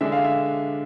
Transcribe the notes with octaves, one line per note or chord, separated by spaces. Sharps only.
D3 G#3 D4 E5
F5
E5